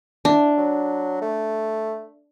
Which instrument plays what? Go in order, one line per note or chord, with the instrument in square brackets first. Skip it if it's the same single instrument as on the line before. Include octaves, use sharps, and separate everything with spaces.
[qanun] D4 [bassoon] E4
[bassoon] F#3
A3